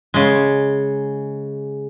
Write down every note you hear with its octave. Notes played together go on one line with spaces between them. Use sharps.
C#3 G#3